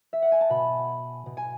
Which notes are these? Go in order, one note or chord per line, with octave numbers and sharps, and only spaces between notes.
E5
F#5
G#5
A5
B2 B5
B2
G#5